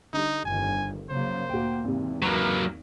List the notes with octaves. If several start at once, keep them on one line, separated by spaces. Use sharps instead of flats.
D3 G3 D#4
G1 F2 D#3 G#5
C#3 F#3 A#3 C5
D2 A#2 A#3 F#4 G5
G#1 E2 C3
F#3 A#3 B4